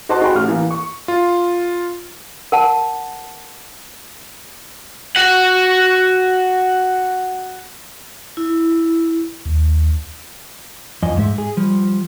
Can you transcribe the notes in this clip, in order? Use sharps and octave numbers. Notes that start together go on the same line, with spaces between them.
F#4 C5 D#5 A5 C6
F#4 G#4 A4 G5 B5 C6
A1 F6
E3 A#3
C#6
F4
A#4 F#5 A5
F#4 F#5
E4
D#2
F2 D#5 G#5
G#2 G#3 E5
G#4
F3 G3